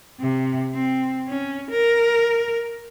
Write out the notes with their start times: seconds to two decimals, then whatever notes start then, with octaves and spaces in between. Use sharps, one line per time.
0.20 C3
0.74 C4
1.28 C#4
1.70 A#4